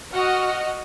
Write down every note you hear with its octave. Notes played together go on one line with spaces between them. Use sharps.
F#4 D#5 F#5 F6